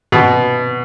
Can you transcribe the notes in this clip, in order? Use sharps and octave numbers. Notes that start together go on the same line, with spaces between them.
B2